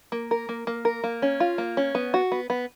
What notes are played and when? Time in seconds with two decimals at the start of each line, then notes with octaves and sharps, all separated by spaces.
0.12 A#3
0.31 A#4
0.49 A#3
0.67 A#3
0.85 A#4
1.04 A#3
1.22 C#4
1.40 F4
1.58 A#3
1.77 C#4
1.95 B3
2.14 F#4
2.32 B3
2.50 B3